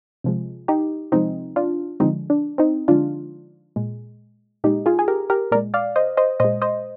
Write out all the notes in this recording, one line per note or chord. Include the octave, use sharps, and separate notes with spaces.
C3 F3 G#3
D#4 G4
C3 F3 G#3 C4 D#4
D4 F4
D3 F3 G#3 C4 D#4
D4
C4 D#4
D3 F3 G#3 D4 F4
A#2 G#3
A#2 G#3 D#4 G4
F4 G#4
G#4
G4 A#4
G4 A#4
A#2 G#3 A#4 D5
D5 F5
C5 D#5
C5 D#5
A#2 G#3 C5 D#5
C5 D#5